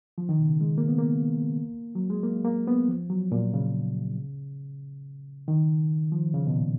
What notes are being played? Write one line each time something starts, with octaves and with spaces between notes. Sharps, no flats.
F3
D#3
B2
C#3
G#3
A#3
B3
A#3
F#3
G#3
A#3
A#3
B3
F3
F#3
A#2
C#3
D#3
F3
C#3
B2
A#2